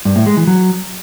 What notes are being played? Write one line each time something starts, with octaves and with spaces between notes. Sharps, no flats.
G2
A2
G#3
E3
F#3